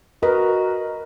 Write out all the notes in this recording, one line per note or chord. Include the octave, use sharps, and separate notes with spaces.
F#4 A#4 B4 D#5